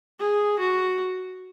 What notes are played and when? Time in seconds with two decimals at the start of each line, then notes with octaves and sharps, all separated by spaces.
0.20 G#4
0.59 F#4